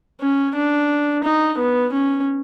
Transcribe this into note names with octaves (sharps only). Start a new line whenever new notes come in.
C#4
D4
D#4
B3
C#4